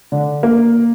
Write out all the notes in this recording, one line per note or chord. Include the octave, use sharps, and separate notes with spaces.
D3
A#3